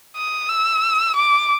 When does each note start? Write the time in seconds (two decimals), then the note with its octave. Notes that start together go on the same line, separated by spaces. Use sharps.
0.17 D#6
0.49 E6
1.16 D6